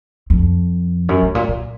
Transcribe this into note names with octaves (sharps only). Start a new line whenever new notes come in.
F2
F#2
A2
A#2
A#2